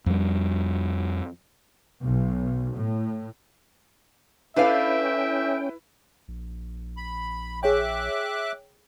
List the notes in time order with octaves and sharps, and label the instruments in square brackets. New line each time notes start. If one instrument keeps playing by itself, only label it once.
[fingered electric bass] F2 G3
[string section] B1
A2
[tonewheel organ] C#4 G5 [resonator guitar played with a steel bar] D4 A4 F5 [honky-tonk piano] E4 B4 [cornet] E5
[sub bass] A#1
[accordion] B5
[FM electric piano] G#4 C#5 G5 [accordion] E5 D6 F#6